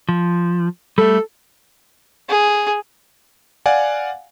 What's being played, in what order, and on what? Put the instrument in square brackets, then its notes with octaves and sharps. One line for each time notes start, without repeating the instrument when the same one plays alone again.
[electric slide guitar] F3
[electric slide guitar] G3 A3 [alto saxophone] A4
[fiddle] G#4
[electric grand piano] D5 F5 F#5 G#5